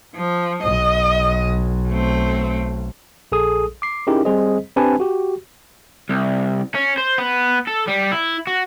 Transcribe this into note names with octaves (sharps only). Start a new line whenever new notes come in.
F3
B1 D#5
A3 C4
A#1 G#4 A4 D#6
D6 C7
C#4 D#4 E4 G4 G#4 A#4
G3 C4 G#4 C5 D#5
C4 D4 G4 B4 G#5 A5
F#4 G4
C2
C#4
C5
B3
A4
G3
E4
F#4